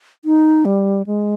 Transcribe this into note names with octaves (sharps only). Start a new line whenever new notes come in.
D#4
G3
G#3